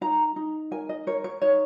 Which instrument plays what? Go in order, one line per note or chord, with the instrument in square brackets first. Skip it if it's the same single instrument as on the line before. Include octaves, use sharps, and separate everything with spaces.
[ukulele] D#4 A#5
D#4
A#4 G#5
D#5
A#4 C#5
C#5
D#4 C#5